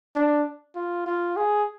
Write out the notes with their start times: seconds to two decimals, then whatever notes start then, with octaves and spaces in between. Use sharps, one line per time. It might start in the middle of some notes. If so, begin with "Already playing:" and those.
0.16 D4
0.76 F4
1.06 F4
1.37 G#4